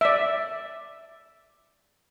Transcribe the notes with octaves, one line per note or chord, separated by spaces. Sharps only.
D5 E5